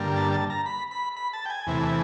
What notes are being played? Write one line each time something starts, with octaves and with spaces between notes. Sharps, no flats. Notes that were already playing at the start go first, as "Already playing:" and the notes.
Already playing: G2 D3 G3 A#3
A5
A5
A#5
B5
B5
B5
A5
G5
G#5
E2 C3 E3 A3